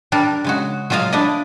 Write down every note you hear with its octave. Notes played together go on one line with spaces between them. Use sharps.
G3 D4 A#4
C#3 G#3 F#4
F#3 G#3 F4 D#5 F5
D4 E4 D5 D#5